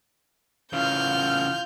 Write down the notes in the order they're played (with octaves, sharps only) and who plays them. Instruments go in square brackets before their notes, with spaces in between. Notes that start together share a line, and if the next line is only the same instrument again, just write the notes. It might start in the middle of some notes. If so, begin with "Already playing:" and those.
[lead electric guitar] C#3 E3 [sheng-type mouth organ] F4 [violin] F6 G6